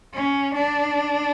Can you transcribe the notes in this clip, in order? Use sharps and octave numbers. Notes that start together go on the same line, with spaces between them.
C#4
D4